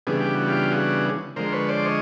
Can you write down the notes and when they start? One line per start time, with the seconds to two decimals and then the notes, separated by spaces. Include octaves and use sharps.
0.07 C#3 E3 G3 B3 D4 G#4
0.21 G4
0.35 F#4
0.48 F4 G4
0.71 F#4 G#4
1.36 D3 F3 G#3 A#4 C5
1.52 B4 C#5
1.69 C5 D5
1.85 C#5 D#5